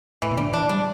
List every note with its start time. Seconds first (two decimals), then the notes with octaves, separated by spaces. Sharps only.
0.22 A2 E3
0.31 B2
0.37 D3 G3
0.53 E3 D4
0.69 G3 D4